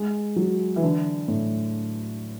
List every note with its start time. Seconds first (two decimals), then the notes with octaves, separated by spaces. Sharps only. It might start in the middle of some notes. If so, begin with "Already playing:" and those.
Already playing: G#3
0.36 F#3
0.76 E3
0.83 D3
1.28 A2